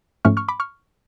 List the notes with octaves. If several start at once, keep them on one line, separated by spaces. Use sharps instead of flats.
G#2 F3 A3 C#4 C#6 F6
C#6 F6
B5 D6
C#6 F6